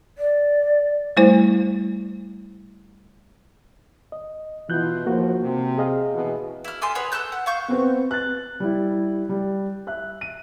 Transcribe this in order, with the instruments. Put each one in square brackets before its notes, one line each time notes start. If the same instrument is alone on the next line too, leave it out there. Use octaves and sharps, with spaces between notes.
[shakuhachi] D5
[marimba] G3 A3 E4 C5
[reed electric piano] D#5
[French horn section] B2 E4 F4 [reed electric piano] E3 F#6 G6
[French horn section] D#2 F3 [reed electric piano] A#3 F#4
[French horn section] C3
[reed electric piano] G#4 D#5 F5
[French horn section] B2 E3
[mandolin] E4 F6
G4 A4 G#5 C6
G#4 B4 C#5 F#5
A4 A5 F#6 G6
F#5
F5 C#6 G6
[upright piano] B3 C4 B4
F#6 A6
G3 E4
G3
E5 F#6
D#7